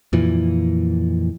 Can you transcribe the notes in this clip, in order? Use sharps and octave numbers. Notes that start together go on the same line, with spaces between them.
F2 A#2 E3